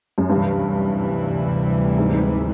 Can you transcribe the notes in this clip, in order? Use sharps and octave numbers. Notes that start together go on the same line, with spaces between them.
F#2
D2 G2 C3 E3 G3
G#2